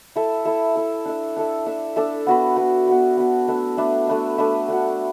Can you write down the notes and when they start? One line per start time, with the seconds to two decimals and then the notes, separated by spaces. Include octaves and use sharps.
0.16 E4 A4 E5
0.45 E4 A4 E5
0.75 E4 A4 E5
1.05 D4 A4 E5
1.36 D4 A4 E5
1.66 D4 A4 E5
1.96 D4 A4 E5
2.27 B3 F#4 B4
2.56 B3 F#4 B4
2.87 B3 F#4 B4
3.17 B3 F#4 B4
3.48 A3 D4 B4 E5
3.77 A3 D4 B4 E5
4.07 A3 D4 B4 E5
4.38 A3 D4 B4 E5
4.68 A3 D4 F#4